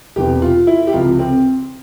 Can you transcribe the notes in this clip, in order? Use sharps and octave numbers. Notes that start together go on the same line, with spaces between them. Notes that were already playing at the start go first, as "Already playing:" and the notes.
E1 E2 C3 E3 G4
F4
E4
G4
C#2 C3 F3 F4
C4